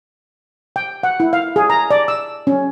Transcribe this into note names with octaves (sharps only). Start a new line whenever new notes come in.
G5
F#5
E4
F5
G#4
A#5
D5
E6
C#4